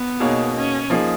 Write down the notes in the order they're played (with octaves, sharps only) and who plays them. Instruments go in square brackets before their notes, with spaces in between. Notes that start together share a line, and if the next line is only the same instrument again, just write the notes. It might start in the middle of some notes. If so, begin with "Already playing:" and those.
Already playing: [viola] B3
[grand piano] B2 A#3 D#4 G#4 C#5
[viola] C#4
[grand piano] F3 A#3 D#4 G#4